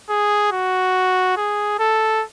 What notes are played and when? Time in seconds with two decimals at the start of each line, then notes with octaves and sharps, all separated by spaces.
0.10 G#4
0.52 F#4
1.37 G#4
1.79 A4